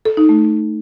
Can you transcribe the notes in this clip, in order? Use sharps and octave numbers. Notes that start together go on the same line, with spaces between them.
A4
D#4
A3